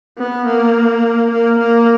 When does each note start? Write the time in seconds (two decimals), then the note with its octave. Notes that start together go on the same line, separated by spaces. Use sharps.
0.18 B3
0.46 A#3
1.31 A#3
1.59 A#3